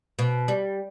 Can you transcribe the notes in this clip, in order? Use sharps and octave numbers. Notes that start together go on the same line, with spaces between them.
B2
G3